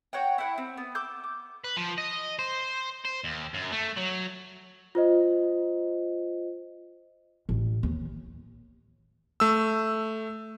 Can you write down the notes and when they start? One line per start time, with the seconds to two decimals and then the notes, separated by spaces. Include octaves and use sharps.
0.13 F#4 C#5 F#5 G5
0.38 E4 F#5
0.58 C4
0.77 B3
0.95 D6 E6 G6
1.24 D6
1.64 B4
1.77 F3
1.98 D#5
2.39 C5
3.05 C5
3.24 D#2
3.54 F#2
3.72 A3
3.97 F#3
4.95 F4 C5 D#5
7.49 A1
7.83 D#2
9.40 A3 E6